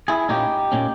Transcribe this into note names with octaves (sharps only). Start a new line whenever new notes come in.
E4 G#4
A#2 A#3 C#4 D#4 G4
A#2 A#3 C#4